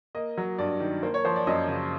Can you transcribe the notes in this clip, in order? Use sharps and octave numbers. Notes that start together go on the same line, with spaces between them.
A#3 D#5
F#3
G2 D5
D#3
A#3 C5
C#5
F3 C5
D5
F#2 D#5
C#3